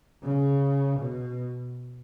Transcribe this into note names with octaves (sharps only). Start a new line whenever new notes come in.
C#3
B2